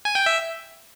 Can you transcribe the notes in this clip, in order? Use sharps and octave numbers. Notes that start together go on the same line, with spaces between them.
G#5
G5
E5